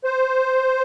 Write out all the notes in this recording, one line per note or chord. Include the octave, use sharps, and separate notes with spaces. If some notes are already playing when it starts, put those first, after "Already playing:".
C5